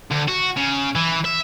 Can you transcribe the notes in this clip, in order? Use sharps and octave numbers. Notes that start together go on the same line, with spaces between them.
D2
F#4
C#3
E3
E5